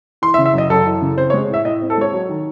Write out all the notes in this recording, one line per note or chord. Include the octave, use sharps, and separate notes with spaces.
E3 C6
E5
C#3
E5
F#2 D#5
F#2 A4
E3
C#3
C4 C5
C#5
G#3
A2 E5
A2 D#5
C4
A4
G#3 C#5
F#3
D#3